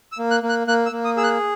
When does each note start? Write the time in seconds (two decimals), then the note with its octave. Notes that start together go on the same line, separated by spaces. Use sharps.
0.12 E6
0.18 A#3
0.31 F#6
0.43 A#3
0.49 F#6
0.67 A#3 F#6
0.86 E6
0.92 A#3
1.05 D#6
1.17 G#4 E6
1.24 F#6